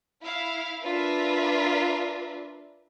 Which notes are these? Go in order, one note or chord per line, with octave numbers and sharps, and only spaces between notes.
E4 F5
D4 F4 A#4 B4 E5